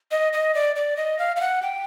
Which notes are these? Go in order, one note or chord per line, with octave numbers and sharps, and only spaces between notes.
D#5
D#5
D5
D5
D#5
F5
F5
F#5
G5